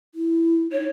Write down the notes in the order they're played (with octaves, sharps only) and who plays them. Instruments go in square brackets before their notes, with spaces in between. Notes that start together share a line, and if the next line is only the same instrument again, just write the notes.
[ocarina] E4
[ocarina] D#4 [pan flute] C#5